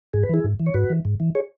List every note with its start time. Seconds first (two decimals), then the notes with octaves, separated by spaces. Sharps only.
0.13 G#2 G#4
0.23 B4
0.29 E3 E4 G#4
0.44 G#2
0.60 E3
0.66 C#5
0.74 G#2 F#4 B4
0.90 E3
1.05 G#2
1.20 E3
1.35 G#4 C#5